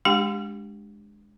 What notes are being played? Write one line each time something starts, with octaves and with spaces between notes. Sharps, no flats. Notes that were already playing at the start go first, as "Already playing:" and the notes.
G#3 D4 G4 G5